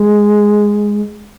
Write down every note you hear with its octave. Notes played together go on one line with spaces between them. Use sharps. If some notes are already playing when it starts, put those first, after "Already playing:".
Already playing: G#3